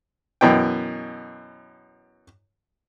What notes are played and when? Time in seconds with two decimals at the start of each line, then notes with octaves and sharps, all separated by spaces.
0.41 F#2 B2 E3 G5